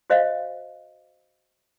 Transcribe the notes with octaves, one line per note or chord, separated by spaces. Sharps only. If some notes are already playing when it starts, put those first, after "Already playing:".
F#4 C5 D#5 F5